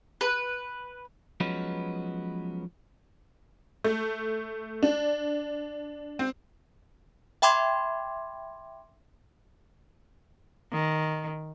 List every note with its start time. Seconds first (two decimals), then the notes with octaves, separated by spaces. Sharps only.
0.21 B4
1.40 F3 F#3 G#3 B3 C#4 B4
3.84 A3
4.83 D4
6.19 C4
7.42 E5 G5 B5 C6 D6 G#6
10.72 D#3